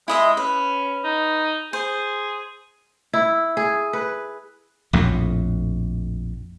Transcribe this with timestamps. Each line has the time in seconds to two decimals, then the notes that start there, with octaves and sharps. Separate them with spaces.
0.08 G#3 E4 D#5 E5
0.37 C#4 B4
1.04 D#4
1.73 G#4 C5
3.13 E4
3.57 G#4
3.93 B4
4.93 A#1 F2 A2